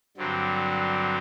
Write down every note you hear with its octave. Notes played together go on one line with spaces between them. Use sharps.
G2 D3 F#3 C4